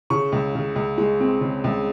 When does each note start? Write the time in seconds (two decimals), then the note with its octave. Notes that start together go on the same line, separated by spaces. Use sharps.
0.10 C#3 C#6
0.32 C#2
0.55 C#3
0.76 C#2
0.98 G#3
1.20 C4
1.41 C#3
1.64 C#2